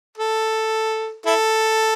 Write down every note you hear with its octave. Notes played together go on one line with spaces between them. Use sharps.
A4
E4 A4